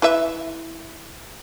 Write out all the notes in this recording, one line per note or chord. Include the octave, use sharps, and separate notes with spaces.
E4 B4 E5